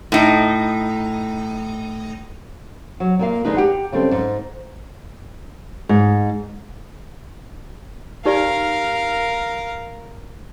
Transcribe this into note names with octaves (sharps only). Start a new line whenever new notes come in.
A2 D#4
F#3
A#2 A#3 F5
D3 G#3 D#4 B4
G4 F#5
C#3 G3 C4 A4
G#2
G#2
D#4 G4 A#4 D5 F5